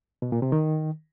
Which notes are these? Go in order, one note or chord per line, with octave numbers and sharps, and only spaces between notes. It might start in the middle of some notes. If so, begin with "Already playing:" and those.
B2
A#2
C3
D#3